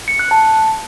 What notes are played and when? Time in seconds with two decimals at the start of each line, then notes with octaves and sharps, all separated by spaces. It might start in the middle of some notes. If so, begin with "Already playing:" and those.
0.08 C#7
0.19 F#6
0.31 A5